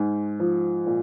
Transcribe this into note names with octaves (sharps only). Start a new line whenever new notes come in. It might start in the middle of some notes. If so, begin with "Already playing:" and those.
Already playing: G#2
F3
A#2